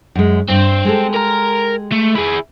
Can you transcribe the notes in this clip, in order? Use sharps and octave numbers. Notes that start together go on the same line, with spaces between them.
F#2 G#3
G2 C4
G#3 G4 A4
A#4 A#5
A3
E4 G#4